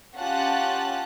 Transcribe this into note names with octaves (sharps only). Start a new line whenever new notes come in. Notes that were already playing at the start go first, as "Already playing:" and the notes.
C#4 F4 G4 F#5 A5 F#6